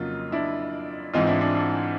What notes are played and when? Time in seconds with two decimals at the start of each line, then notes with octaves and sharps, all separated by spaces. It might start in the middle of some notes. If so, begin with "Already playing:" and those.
Already playing: F2 C#3 F#3 A#3 D#4 F4
0.32 D4 E4
1.14 G#2 E3 G#3 C4 D#4 F4
1.27 D4 E4
1.41 D4
1.55 D4